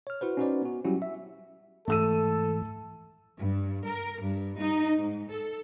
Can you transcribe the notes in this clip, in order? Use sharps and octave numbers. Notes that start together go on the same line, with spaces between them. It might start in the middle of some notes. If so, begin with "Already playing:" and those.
C#5 F6
E4 F#4 B4 C5
C#4 D#4 F#4 B4 C5 D5
B3 F#4
F#3 G3 C#4 E4 F#4 G4
E5
G#2 E3 A3 A4 E6 D#7
G2
A#4
G2
D#4
G#2
A4